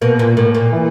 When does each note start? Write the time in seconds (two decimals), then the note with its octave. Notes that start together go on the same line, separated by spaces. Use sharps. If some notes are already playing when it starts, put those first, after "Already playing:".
0.01 B2 A#3
0.19 A#2
0.37 A2 A#3
0.54 A#2
0.72 E3